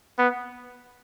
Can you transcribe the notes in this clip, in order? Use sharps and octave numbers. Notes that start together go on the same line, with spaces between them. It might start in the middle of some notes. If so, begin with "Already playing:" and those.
B3